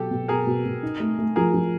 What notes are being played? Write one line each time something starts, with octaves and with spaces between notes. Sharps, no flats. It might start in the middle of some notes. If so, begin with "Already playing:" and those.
Already playing: B2 F#3 G4 A4
B2
B2 G#4 A#4
B2
B2
D#4
A3
A3
F3 G#4 A#4
F3